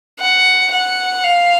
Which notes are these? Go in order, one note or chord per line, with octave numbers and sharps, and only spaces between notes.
F#5
F#5
F5